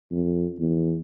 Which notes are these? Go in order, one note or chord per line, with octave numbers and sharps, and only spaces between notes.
F2
E2